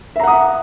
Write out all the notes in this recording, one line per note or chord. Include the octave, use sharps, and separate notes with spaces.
E5 F#5 A#5 D#6